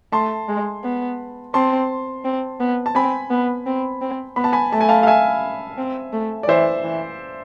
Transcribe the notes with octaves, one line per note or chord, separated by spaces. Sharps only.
A3 A5 C6
G#3
B3
C4 A5 C6
C4
B3
A5
C4 G#5 B5
B3
C4
C4
B3 B5
A5
G#5 B5
A3 A5
G#5
F5 A5
F5
E5 G#5
C4
A3
D5
E3 C5 E5
E3